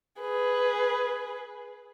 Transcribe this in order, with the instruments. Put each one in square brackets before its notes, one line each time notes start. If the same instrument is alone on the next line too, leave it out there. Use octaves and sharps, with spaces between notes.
[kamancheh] G#4 B4